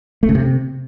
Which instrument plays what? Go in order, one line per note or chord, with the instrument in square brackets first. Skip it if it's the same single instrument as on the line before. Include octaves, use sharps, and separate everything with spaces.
[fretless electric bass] A3
C#3
C3